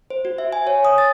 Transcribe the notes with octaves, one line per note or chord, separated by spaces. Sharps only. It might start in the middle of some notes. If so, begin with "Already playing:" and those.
C5
F#4
E5
G#5
C#5
D#6
A6